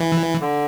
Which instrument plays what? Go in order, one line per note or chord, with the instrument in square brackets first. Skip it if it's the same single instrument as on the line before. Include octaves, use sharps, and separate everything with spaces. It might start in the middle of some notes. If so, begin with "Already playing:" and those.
Already playing: [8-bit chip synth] E3
[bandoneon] D3